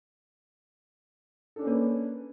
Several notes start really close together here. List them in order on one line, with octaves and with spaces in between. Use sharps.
A4 D4 C#4 A#3 B4